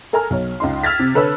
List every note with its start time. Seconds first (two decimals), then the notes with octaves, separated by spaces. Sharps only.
0.13 A4 A#4 G#5 A#5 F6
0.30 B1 C#5
0.60 C#2 D#4 C6
0.83 E6 F6 G#6 A6 B6
0.99 C3
1.15 D3 A4 B4 C#5 E6